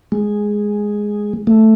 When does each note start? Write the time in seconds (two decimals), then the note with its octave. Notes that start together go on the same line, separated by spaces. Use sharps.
0.12 G#3
1.47 A3